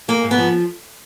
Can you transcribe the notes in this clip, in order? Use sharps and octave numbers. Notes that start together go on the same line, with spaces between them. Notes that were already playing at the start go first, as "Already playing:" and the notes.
G#2 A#3
G#2
B3
F3